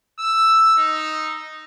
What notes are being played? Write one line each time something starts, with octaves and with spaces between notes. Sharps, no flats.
E6
D#4